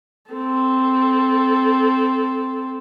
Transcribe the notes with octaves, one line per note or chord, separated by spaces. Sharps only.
C4 A4